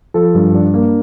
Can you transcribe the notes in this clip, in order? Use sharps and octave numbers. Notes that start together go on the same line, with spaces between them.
F3 A4
G2
D4
A#3